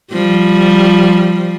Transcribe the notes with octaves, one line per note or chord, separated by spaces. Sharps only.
F3 G3